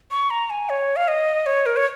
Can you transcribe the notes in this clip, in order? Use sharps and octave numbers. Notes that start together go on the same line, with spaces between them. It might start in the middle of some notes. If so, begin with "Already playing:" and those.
C#6
A#5
G#5
C#5
F5
D#5
C#5
A#4
C#5